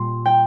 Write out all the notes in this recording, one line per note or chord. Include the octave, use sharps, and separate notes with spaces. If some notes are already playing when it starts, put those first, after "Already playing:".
Already playing: A#2 G3 C6
G5